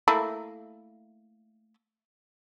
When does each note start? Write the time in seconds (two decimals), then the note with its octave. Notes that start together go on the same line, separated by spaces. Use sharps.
0.08 A3 A#3 E4